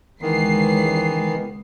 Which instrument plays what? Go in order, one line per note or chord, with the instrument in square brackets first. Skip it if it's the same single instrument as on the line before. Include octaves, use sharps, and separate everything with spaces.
[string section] C#2 C7 [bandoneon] D#3 E3 B3